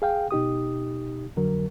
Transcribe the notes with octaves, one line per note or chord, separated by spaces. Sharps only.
G#4 F5 G5
B2 D#4 G4 D#6
F2 D3 F#3 A#4